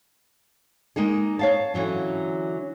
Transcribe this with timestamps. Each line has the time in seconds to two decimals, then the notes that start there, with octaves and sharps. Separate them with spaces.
0.96 G#3 A#3 D#4 G#4
1.39 C#5 F5 A5
1.74 D3 E3 F#3 C#4